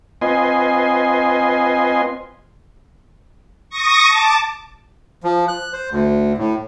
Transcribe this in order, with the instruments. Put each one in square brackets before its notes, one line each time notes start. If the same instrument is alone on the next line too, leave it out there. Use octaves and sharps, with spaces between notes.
[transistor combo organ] C4 F4 B4 D#5 G#5 C6
[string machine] C#6 D#6 A#6
A5 D6
[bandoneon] F3
F#6
C5
D2
A2